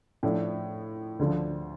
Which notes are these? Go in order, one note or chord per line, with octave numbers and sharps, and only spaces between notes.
A2 F3 A3 D4
D2 D3 F3